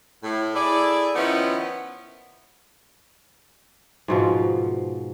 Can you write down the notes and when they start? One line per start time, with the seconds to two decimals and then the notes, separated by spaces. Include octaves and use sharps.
0.23 A2
0.55 E4 G#4 A4 D5
1.16 D#3 F3 B3 C#4 D#4 E4
4.08 G#2 B2 F3